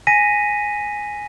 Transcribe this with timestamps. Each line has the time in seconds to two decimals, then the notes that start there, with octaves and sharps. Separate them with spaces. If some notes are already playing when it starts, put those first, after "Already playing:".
0.07 G#5 A#6 B6 D#7